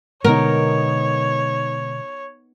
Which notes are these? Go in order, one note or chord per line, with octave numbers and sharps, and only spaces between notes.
B2 D3 G#3 B3 D#4 A#4 C#5